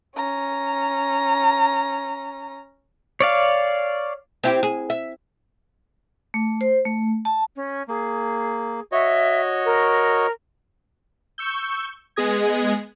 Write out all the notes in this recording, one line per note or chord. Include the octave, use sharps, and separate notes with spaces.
C#4 A#5
C#5 D5 F5
C4 E4 G4
G#4
E5
A3
C5
A3
A5
C#4
A#3 G#4
F#4 C#5 D#5 E5
A#4
C#6 E6 G6
G#3 B3 G#4 D#5 G#6